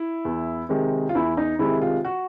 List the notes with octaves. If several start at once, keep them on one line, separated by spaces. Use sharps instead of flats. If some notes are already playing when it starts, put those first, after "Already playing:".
Already playing: E4
E2
C3 D#3 G#3
F4
E2 E4
D#4
C3 D#3 G#3 E4
F4
F#4